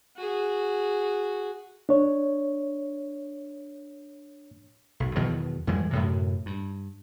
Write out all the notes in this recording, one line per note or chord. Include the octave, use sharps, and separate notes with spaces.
F#4 G#4
D4 C#5
B1
E2 B2 D#3 F#3
F2 E3 G3 G#3
F#2 A2 C3
G2